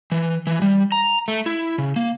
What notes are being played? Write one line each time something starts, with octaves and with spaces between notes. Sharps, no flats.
E3
E3
G3
A#5
A3
E4
C#3
A#3